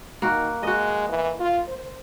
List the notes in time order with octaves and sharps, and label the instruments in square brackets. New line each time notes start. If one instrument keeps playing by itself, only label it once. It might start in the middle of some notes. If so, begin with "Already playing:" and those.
[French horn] D#3 [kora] A#3 F#4
[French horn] G#3 [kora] F#4 D#5
[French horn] E3
F4
C5